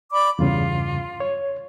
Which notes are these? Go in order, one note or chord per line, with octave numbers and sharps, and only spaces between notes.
D5 B5 D6
E2 G2 C#3 F4
C#5